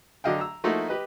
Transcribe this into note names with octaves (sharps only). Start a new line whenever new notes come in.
D3 F#3 D#5 F5 G5
A#5 E6
F3 A3 A#3 D#4 E4 F#4
G4 B4 D#5